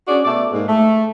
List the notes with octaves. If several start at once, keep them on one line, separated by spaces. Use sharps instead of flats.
C#4 D4 F#4 G#4 D5
B2 A3 D5
G#2 A#3
A3